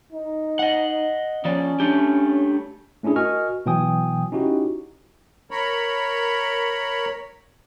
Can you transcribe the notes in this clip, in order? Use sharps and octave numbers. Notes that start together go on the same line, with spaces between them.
D#4
D#5 F#5
F3 C#4 D5
A3 D4 G4
A3 C#4 D4 E4 G#4
F#4 A#4 D#5 G#5 C#6 F6
B2 E3 F#3 G5 G#5 D#6
C#4 D#4 E4 F#4 G4
A#4 C#5 B5